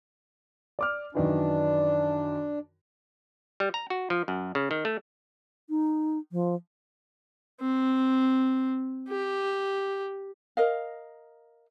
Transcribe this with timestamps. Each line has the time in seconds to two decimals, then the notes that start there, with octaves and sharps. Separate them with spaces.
0.79 D5 D6 F6
1.15 F#2 D#3 E3 D4
3.60 G3
3.74 A#5
3.90 F#4
4.10 F3
4.28 F#2
4.55 C#3
4.71 D#3
4.85 A3
5.70 D#4
6.32 F3
7.61 C4
9.08 G4
10.57 A#4 D#5 F5